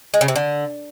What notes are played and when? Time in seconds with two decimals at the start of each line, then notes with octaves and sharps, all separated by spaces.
0.14 G#3
0.21 C#3
0.28 C3
0.36 D3